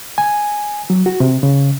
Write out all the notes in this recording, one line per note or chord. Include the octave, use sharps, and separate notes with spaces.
G#5
F#3
F#4
C3
C#3